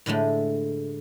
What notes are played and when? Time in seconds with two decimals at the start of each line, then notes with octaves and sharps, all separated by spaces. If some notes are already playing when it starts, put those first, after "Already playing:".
0.06 A2 D3 G#3 A3